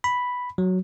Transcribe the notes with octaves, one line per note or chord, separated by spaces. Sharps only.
B5
F#3